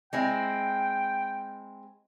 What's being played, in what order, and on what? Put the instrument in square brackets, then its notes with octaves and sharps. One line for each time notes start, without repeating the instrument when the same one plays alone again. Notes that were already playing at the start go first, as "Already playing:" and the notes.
[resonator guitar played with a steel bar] G#3 C4 E4 [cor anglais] G5